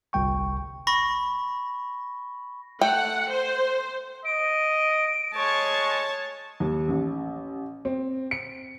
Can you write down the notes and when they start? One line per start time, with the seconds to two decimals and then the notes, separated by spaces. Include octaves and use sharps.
0.13 G1 C2 G3 G5 C#6
0.87 B5 C#6 A#6
2.81 A3 F#5 G5
3.30 C5
4.25 D#5 D7
5.35 G#3 C#5 A5 C#6
6.60 D#2
6.88 A1
7.85 C4
8.31 C#7